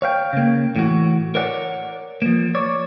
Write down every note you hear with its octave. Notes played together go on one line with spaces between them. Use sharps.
C#5 F5 G5
C#3 A#3
A2 E3 F#4
A#4 C#5 D5 F#5
F3 A#3
C#5 D5